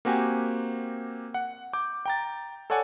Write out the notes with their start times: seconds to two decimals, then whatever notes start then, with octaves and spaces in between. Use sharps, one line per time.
0.05 A#3 C4 F#4 G4 G#5
1.34 F#5
1.73 D6 G6
2.06 G5 A#5 A6
2.70 A4 C#5 D5 F#5 G#5